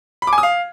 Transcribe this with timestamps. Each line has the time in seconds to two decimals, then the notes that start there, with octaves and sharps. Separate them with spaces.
0.22 B5
0.27 D6
0.33 G#5
0.38 D#6
0.43 F5